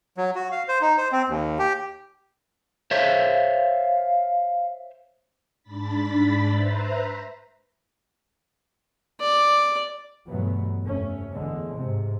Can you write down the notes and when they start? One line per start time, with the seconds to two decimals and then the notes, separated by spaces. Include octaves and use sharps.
0.17 F#3
0.35 F#4
0.51 F5
0.68 C5
0.81 D#4
0.97 C5
1.12 C4
1.29 D#2
1.59 G4
2.91 C5 C#5 E5 F5
5.63 G#2 D4 B5 A6 B6
6.52 B4 C5 E5 A#5
9.21 D5
10.27 E2 G2 B2 F#3 A3 B3
10.84 F1 A3 C#4
11.32 A1 E2 D3 G#3
11.74 G#2 C3